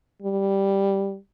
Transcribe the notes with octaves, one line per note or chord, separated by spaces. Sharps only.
G3